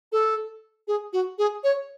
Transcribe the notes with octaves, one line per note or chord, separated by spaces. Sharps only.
A4
G#4
F#4
G#4
C#5